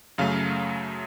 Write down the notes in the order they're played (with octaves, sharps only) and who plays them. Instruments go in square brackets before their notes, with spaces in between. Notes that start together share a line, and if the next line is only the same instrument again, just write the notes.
[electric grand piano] F#2 C#3 F#3 A3 F5